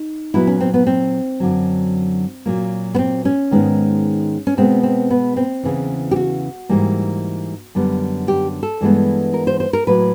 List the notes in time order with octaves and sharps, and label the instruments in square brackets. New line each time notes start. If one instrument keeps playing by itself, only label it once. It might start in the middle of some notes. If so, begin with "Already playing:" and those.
Already playing: [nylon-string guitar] D#4
A#2 F#3 B3 E4
C#4
C4
B3
C4
F#2 D3 F#3
A#2 F#3 A#3
B3
C4
C#4
G#2 D#3 G#3 B3
C#4
B2 G#3 B3 C4
C4
B3
C4
E2 C#3 E3
G4
F#4
G#2 E3 G3 A#3
F#2 D3 G3 B3
G4
A4
G2 E3 G#3 B3
A#4
C5
C5
A#4
A2 F#3 A#3 B4